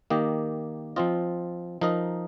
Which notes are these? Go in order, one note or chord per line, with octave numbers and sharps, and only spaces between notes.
D#3 A#3 G4 D#5
F3 C4 F4 D#5
F3 D#4 A#4 D#5